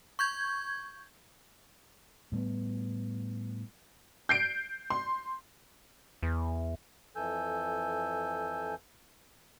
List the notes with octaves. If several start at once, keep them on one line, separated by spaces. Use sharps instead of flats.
C#6 G6 G#6
A2 G3 A#3 B3
G6 C7 D7
C6
E2
F2 E3 A4 G#5 E6 G6